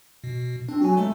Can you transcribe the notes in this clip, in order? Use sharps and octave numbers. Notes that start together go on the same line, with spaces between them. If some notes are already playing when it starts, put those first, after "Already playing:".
B2
C4 D4
F#3 F#4 G#5
G#3 A3